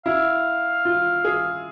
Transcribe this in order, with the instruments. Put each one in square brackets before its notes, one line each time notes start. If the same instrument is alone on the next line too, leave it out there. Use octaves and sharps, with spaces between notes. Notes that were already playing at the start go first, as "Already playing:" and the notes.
[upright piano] E4 [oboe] F5
[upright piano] F4
G#4